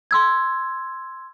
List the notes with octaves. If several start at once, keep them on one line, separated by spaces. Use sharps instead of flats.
C6 E6 G#6